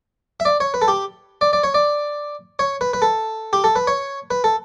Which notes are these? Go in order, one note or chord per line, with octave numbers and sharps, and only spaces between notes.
E5
D5
C#5
B4
A4
G4
D5
D5
C#5
D5
C#5
B4
B4
A4
G4
A4
B4
C#5
B4
A4